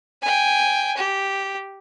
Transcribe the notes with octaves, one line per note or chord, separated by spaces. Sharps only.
G5 G#5
G4